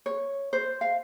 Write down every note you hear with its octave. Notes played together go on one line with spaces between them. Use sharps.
C#5
C5
F5